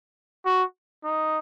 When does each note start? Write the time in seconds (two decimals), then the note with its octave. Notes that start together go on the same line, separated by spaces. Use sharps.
0.45 F#4
1.04 D#4